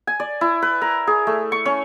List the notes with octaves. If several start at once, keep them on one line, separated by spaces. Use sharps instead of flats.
G#5
D5
E4
B4
A#4
G#4
A3
C#6
C#4